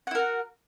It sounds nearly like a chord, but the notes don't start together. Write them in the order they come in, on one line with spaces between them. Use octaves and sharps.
F#5 E4 A#4 F#4